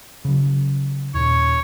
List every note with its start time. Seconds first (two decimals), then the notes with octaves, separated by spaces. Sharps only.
0.25 C#3 F#3
1.14 D#2 A#2 C#5